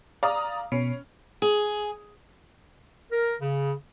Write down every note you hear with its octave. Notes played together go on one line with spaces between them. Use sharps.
D5 F5 A#5 D#6
B2 C#4
G#4
A#4
C#3